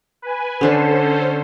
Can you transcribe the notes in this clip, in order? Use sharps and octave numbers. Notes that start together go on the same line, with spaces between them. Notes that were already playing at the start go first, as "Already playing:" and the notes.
B4 G#5
D3 C#4 D4 A4 B4 C5